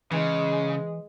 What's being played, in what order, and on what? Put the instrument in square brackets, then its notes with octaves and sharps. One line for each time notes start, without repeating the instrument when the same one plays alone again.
[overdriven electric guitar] C#3 [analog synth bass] E3 [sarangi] G#3